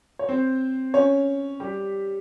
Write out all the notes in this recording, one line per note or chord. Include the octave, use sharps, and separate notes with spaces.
C#5
C4 C5
C#4 C#5
G3 G4